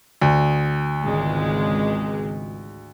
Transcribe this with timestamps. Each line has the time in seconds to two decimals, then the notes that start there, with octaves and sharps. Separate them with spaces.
0.22 D2
1.03 G#1 C#2 G#3